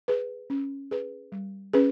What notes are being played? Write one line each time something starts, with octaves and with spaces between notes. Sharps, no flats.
G#4 B4
C#4
G#4 B4
G3
C#4 G#4 B4